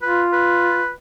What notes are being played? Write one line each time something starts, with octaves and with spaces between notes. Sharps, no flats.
F4 B4
B4